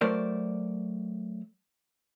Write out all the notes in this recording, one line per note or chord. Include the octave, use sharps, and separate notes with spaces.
F#3 A3 A#4 C5 D5